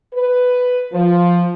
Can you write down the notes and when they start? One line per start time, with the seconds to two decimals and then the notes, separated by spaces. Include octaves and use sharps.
0.14 B4
0.93 F3